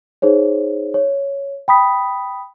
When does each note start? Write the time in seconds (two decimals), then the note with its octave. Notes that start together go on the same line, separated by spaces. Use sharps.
0.22 D#4 G#4 C5 C#5
0.94 C#5
1.68 G5 B5 D#6 B6